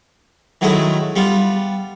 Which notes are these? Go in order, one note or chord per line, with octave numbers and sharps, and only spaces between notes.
D#3 F#3 G#3 A3 E4
G3 B3 F4